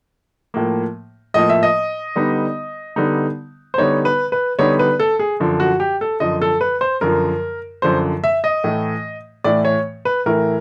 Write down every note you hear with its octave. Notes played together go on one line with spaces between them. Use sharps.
A2 F3 A#3
A2 F3 A#3 D#5
E5
D#5
D3 G3 B3 D#4
D3 G3 B3 D#4
C5
D3 G3 B3 D#4 C#5
B4
B4
D3 G3 B3 D#4 C#5
B4
A4
G#4
F#2 D3 F3
F#4
G4
A4
F#2 D3 F3 D#5
A4
B4
C5
F#2 D3 F3 A#4
F#2 D3 F3 C5
E5
D#5
A2 E3 A3
A2 E3 A3 D5
C#5
B4
A2 E3 A3 A#4